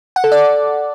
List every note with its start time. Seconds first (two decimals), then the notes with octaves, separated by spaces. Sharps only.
0.16 F#5
0.24 A4
0.32 D5